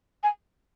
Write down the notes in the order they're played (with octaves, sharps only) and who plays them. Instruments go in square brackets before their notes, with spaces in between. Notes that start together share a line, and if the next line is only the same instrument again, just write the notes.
[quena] G#5